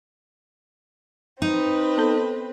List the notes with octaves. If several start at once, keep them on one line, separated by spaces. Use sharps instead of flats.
C4 D#4 B4
B3 A4